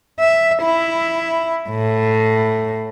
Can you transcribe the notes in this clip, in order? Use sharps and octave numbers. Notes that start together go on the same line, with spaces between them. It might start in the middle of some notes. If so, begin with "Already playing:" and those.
E5
E4
A2